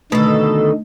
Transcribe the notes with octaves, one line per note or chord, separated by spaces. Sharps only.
B2 D3 D#3 A3 D#4 A4